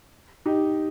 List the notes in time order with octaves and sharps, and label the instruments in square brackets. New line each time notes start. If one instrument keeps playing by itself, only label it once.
[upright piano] D#4 G4